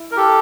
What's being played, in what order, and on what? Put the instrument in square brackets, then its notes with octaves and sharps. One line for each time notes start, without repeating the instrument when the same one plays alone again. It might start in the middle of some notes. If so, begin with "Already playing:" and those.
Already playing: [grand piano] E4
[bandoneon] A#4
G4 A4